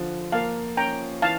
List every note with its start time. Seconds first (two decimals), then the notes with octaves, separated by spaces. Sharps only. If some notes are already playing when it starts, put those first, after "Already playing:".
Already playing: D3 F3
0.32 A#3 F5 A5
0.77 C#4 G5 A#5
1.22 E3 F5 A5